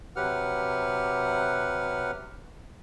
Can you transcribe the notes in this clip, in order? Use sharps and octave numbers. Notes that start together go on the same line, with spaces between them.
C3 F#3 G4 B4 F#5 F6